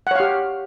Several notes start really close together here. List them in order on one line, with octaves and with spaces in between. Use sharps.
F#5 C#5 F5 G4